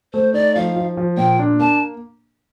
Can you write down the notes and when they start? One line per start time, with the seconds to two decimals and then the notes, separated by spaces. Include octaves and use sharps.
0.14 A3 C5
0.34 D#4 D5
0.55 F3 F5
0.76 F3
0.97 F3
1.17 A#2 G5
1.39 D4
1.59 A#3 A5